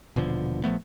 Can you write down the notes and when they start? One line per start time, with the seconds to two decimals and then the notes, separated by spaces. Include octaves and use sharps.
0.16 D#1 B2 D3 F3
0.64 A#1 F3 A3 B3